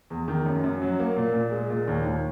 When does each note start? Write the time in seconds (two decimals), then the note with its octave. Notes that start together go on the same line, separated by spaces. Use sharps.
0.10 E2
0.28 D#3
0.46 F#2
0.64 F#2
0.82 F#3
1.00 A#3
1.17 A#2
1.34 A#2
1.51 G#3
1.70 A#2
1.88 D#2
2.05 D#2